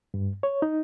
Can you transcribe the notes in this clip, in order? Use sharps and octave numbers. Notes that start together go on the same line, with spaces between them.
G2
C#5
D#4